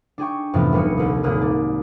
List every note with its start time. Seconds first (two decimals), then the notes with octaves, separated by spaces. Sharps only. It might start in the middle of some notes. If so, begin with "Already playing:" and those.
0.18 D4 G#4 G5 C#6
0.53 F2 G#2 C3 E3 A3 B3
0.73 F1 D#2 G3 F#4 C#7 D#7
0.98 D#1 C2
1.23 D#1 G#1 D#2 A#3 D#6 F#6
1.42 D5